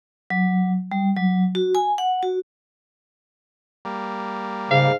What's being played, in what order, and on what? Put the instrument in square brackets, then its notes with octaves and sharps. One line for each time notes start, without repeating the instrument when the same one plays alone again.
[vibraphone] F#3
G3
F#3
F#4
G#5
F#5
F#4
[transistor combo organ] G3 A#3
[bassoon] G#2 [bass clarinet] C#3 [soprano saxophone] F5